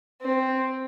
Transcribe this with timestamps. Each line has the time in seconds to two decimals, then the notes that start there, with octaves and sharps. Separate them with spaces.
0.22 C4